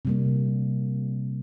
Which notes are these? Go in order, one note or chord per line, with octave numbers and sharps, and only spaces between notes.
C3 G3 A#3